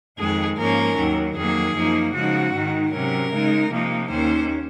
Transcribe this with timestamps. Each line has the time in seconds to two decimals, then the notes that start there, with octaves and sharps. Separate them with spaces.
0.18 F2 D#3 G#3 G#4
0.58 G#2 F3 A#3 C#4 A#4
0.97 D#2 D#3 F#3
1.36 F2 D#3 F#3 A#3 G#4
1.75 F#2 F3 A#3 D#4
2.14 C#3 F3 G#3 D#4 F#4
2.53 G#2 D#3 G#3 D#4
2.92 C3 F#3 C#4 A#4
3.32 C#3 G#3 D#4
3.71 C3 F3 A#3 D#4
4.10 D#2 D#3 A#3 C#4 C5